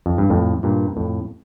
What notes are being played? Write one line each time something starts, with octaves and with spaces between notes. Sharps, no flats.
F2
G2
F2 A2
G2 A#2
F2 A2